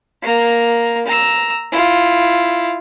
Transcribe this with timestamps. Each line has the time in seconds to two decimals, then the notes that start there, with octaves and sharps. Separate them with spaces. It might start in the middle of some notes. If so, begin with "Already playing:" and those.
0.22 A#3 A#5
1.06 A#5 E6
1.72 E4 F4